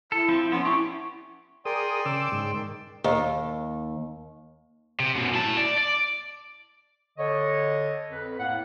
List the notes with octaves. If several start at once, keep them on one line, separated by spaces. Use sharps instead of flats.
E4 A4
F3 C4 C5
B3 C#4 C6
C#4 D4 E4 G4 C#6
G#4 A#4 D5 G5 C6 D#6
C#3 D6 E6
G#2
D#3
D#2
C3
F#2 B2
E4 A5
D5
D5
D3 C#5 D#5
F2 B4
A2 A#3 F#5